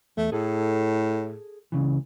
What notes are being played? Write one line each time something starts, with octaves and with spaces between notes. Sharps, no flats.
E2 A3
A2 G#4 A4
C#2 C#3 E3